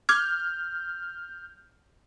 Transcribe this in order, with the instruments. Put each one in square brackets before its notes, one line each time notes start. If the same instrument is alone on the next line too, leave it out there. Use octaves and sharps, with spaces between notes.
[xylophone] D6 G#6 [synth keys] F6 G6